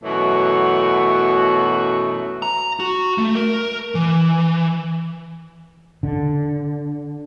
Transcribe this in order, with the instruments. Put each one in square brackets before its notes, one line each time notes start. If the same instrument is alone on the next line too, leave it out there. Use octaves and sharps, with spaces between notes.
[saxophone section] F#2 B2 E3 F#3 A3 F#4
[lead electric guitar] A#5
F#4
A3
A#4
E3
[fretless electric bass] D3